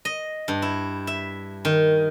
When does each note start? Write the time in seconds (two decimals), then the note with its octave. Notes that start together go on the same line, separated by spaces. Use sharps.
0.05 D#5
0.48 G2
0.62 E4
1.07 E5
1.65 D#3